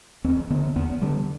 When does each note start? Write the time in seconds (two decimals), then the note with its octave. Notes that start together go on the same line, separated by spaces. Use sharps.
0.24 E2 C4
0.50 D3 B3
0.76 E2 B3
1.02 D3 G3